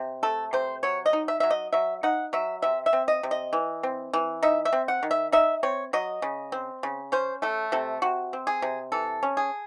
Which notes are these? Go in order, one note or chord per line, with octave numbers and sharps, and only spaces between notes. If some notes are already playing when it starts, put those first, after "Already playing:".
Already playing: C3
A3 A4
C3 C5
F#3 C#5
D#5
D#4
E5
F#3 E5
D#5
F#3 E5
D#4 F#5
F#3 E5
C3 E5
E5
C4
D#5
C3
D#5
E3
C4
E3
D#4 E5
E5
C4
F#5
D#3
E5
D#4 E5
C4 C#5
F#3 D#5
C#3
C4
C#3
C#4 C5
A3 A4
C3 A4
C3 F#4
C4
G#4
C3
E3 A4
C#4
G#4